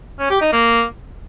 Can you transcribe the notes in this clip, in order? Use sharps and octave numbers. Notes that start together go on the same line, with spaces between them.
C#4
G4
D#4
A#3